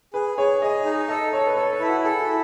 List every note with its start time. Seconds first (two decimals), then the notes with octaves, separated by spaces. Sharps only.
0.14 G#4 B4
0.37 G#4 C#5
0.61 G#4 D#5
0.85 D#4
1.08 A4 D#5
1.33 A4 C#5
1.47 B4
1.56 A4 C#5
1.73 B4
1.81 E4
1.88 F#4
2.04 G#4 A4
2.20 F#4
2.28 E4